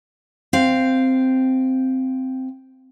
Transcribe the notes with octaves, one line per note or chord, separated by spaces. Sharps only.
C4 F5